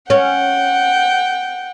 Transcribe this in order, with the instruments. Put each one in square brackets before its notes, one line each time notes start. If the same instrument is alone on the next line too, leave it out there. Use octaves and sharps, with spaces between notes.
[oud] C#4 [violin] F#5 G5